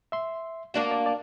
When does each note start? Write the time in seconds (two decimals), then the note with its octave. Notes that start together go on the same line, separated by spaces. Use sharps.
0.12 E5 C6
0.74 A#3 D4 F#4
0.91 D5
1.06 D5 A5